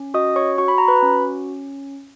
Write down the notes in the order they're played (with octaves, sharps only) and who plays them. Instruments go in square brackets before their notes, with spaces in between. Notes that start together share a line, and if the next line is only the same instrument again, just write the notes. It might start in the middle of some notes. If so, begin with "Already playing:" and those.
Already playing: [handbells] C#4
F#4 D#5 D#6
C#5 C#6
F#4 C#6
B5
A#5
B4 B5
C#4